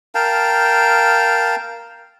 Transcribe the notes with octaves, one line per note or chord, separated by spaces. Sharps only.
A#4 F5 G5 A5